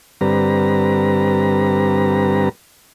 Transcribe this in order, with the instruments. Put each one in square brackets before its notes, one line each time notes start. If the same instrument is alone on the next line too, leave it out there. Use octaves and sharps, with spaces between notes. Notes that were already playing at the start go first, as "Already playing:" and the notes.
[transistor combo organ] G2 D3 G3 C4 B4 A#5